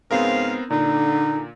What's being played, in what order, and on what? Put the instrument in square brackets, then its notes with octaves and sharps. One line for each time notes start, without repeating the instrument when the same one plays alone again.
[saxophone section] G#2 C#3 F5 [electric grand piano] B3 C4 A#4
[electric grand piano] A#2 [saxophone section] D3 [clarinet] D#4